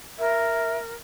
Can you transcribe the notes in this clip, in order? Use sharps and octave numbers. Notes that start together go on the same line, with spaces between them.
A#4 E5